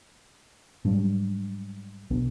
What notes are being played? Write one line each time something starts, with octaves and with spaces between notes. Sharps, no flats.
G#2 F#3 G3 D4
B1 B3 D4